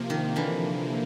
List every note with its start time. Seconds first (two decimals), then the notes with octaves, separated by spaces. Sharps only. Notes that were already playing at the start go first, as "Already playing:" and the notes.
Already playing: C3 F3 A#3
0.10 D#3
0.36 D3 E3